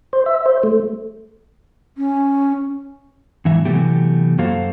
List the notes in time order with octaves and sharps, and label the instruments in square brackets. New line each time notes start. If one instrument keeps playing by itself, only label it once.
[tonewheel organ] C5
E5
C5
A3
[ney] C#4
[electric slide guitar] G#2 E3 E5
C3 E3 F#3 A3 B3 G4
F#2 A#3 F#4 A4 C5 F5